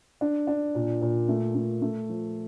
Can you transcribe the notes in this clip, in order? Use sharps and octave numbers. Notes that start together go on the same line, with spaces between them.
D4
D4
A#2
A#2
A3
A3
A3
F3